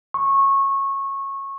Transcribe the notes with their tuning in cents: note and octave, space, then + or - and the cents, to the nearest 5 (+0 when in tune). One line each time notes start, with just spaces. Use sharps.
C#6 -20